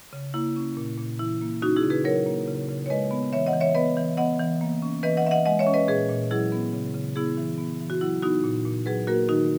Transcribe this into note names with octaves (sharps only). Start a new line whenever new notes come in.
C#3
A#3 E4
C#4
A#2
A#2
E3 E4
A#3
C#4 D#4 F#4
E4 G#4
C#3
G#4 B4
F#3 A#4 C#5
A#3
C#3
C#3
C#5
G#3 B4 D#5
B3
E3 C#5 E5
D#5 F#5
E3
C#5 E5
B3 B4 D#5
E3
B3 D#5 F#5
E3
A#3
C#4
E3 B4 D#5
D#5 F#5
E3 E5
D#5 F#5
G#3 D#5 F#5
C#5 E5
C#4
B4 D#5
A#2 G#4 B4
A#2
F#3 E4 G#4
B3
C#3
C#3
B3 E4 G#4
E3
B3
E3
F#4
F#3 E4
B3 D#4 F#4
A#2
A#2
F#3 G#4 B4
A#3 F#4 A#4
D#3 D#4 F#4